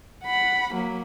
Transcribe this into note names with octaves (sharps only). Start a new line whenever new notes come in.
F#5 B5
F#3 A#3